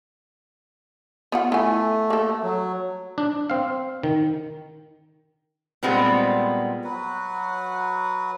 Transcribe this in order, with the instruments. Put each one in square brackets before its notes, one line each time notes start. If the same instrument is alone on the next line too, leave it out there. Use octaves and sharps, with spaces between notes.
[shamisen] B3 F4 F#5
[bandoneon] A3 [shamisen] E4 G#5
[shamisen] A#3 A4
[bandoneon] F#3
[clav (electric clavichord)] D4
C4 F5
D#3
[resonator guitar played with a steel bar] A#2 G3 G#3 B3 C4
[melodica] F#3 F#4 B4